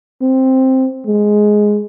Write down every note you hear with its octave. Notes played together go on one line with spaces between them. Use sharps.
C4
G#3